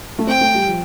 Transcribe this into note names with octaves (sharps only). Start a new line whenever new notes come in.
A3
C4 G5
A3
G3
F3